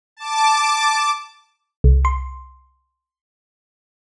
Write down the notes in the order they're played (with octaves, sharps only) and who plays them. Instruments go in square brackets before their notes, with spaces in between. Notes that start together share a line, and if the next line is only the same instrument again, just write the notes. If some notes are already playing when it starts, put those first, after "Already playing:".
[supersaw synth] A5 D6
[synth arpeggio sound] C2
C6